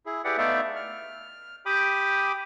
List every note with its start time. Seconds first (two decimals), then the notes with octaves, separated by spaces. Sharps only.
0.06 E4 G#4
0.24 E4 G4 G#4 B4 D5 F#5
0.38 A3 B3 D#4 D5 E5 F5
0.76 F6
1.66 G4 G5 B5 D6 D#6